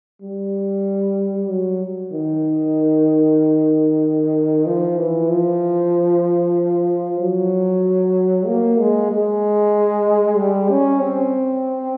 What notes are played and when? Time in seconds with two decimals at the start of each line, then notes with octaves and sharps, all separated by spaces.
0.22 G3
1.49 F#3
2.13 D#3
4.66 F3
4.98 E3
5.30 F3
7.21 F#3
8.47 A#3
8.79 G#3
9.11 G#3
10.37 G3
10.70 C#4
11.01 C4